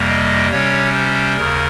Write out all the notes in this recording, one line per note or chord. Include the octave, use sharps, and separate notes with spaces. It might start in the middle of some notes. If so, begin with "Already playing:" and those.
Already playing: F2 C3 G3 A#3
D#5
C3 G3 C#4 C#5
C5
D#2 C#3 A#4